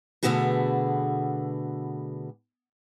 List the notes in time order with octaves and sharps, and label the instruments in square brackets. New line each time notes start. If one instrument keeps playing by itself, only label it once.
[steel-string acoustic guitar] B2 D3 A3 B3 F#4 G#4